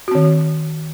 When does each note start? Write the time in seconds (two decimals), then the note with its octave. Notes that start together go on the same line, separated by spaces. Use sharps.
0.08 F#4
0.11 C4
0.15 D#3